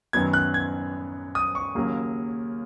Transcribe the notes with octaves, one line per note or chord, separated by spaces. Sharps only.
F#2 D#3 F#3 B3 G#6
F#6
G#6
D#6
C#6
D#2 C#3 F#3 A#3